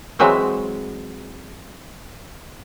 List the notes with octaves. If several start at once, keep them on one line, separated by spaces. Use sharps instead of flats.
E3 F#3 G#3 C4 E5